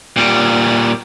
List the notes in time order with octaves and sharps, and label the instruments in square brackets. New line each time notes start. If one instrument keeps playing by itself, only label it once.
[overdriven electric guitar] A#2 G3